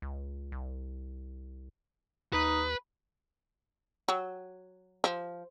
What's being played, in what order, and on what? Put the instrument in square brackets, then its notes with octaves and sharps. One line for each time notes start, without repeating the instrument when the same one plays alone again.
[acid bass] C#2
C2
[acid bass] D#2 [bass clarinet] D#4 [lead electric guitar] B4
[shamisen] F#3
F3